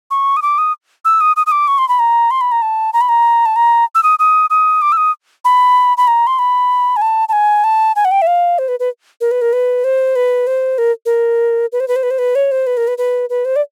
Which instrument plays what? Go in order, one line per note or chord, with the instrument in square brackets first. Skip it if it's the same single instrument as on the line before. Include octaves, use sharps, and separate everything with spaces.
[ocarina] C#6
D#6
D6
D#6
E6
D#6
D#6
D#6
D6
C#6
C6
B5
A#5
C6
B5
A#5
A5
A#5
B5
A#5
A5
A#5
E6
D#6
D#6
D#6
D6
E6
D#6
B5
B5
A#5
C6
B5
G#5
A5
A5
G#5
A5
G#5
F#5
G5
E5
F5
C5
B4
B4
A#4
B4
A#4
B4
C5
B4
C5
A#4
A#4
B4
C5
B4
C5
B4
C5
B4
C#5
C5
B4
A#4
B4
B4
B4
C5
D5